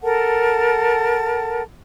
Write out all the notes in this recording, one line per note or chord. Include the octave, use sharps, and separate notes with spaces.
A4 A#4 F#5 A5